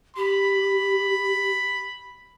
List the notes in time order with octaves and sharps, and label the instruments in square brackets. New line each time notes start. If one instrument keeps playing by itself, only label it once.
[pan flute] G4 [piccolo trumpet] B5